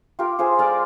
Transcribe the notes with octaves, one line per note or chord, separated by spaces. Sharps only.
F4 G4 A#4
F4 G#4 C5
G#3 A#4 D5